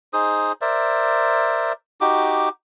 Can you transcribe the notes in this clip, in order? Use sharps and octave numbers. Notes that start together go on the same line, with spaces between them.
D#4 G#4 C5 D#6
A#4 C5 D5 E5
D#4 F#4 G4 D6